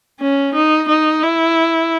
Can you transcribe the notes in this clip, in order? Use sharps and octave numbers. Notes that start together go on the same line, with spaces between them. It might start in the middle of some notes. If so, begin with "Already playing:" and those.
C#4
D#4
D#4
E4